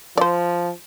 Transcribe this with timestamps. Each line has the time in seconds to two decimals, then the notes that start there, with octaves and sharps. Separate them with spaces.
0.17 F3 C5 D5